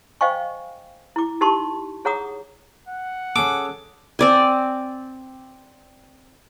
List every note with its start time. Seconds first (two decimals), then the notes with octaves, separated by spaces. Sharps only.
0.21 C5 D#5 F5 G5 G#5 C#6
1.16 E4 D6
1.41 D#4 G4 A#4 A5 C6 C#6
2.05 G#4 C#5 F#5 A#5 D6 D#6
2.88 F#5
3.36 C#4 G#4 A4 D6
4.19 C4 D5 G#5